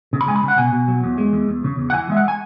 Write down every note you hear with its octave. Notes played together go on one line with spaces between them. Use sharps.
C#3
B5
G#3 G#5
B5
C#3
F#5
B2 G#5
B2
F#3
E2
G#3
E2
E2
C#3
E2
F#5
E3 G#5
G#3 E5
F#5
G#5